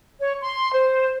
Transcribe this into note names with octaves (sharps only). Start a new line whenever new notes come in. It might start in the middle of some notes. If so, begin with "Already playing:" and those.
C#5
C6
C5